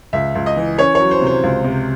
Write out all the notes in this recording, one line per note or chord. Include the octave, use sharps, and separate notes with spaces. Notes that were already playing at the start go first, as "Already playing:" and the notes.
C#2 E5
C#2
D#5
E3
C#4 C#5
F#3 C#5
C5
C3
C5
C#2
C3